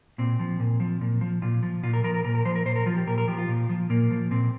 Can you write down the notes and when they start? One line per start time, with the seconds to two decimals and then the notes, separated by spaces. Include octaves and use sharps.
0.18 A#2 C4
0.39 F3
0.60 A#2
0.80 F3
1.01 A#2
1.21 F3
1.42 A#2 F4
1.63 F3
1.83 A#2 F4
1.93 A#4
2.04 F3 A#4
2.14 A#4
2.24 A#2 A#4
2.35 A#4
2.45 F3 C5
2.55 A#4
2.66 A#2 C5
2.76 A#4
2.86 F3 F4
2.97 G4
3.07 A#2 A#4
3.18 A#4
3.28 F3 G4
3.38 F4
3.48 A#2
3.69 F3
3.90 A#2 A#3
4.10 F3
4.31 A#2 C4